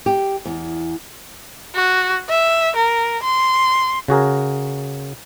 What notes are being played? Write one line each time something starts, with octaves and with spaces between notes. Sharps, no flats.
G4
E2
F#4
E5
A#4
C6
C#3 F#4 G#4 A#4